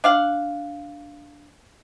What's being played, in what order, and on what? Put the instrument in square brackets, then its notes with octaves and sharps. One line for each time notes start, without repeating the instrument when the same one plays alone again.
[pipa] D4 F5 F#5